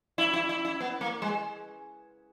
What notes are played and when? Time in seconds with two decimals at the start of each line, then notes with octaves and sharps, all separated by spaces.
0.18 E4
0.33 E4
0.49 E4
0.65 E4
0.80 B3
1.01 A#3
1.22 G#3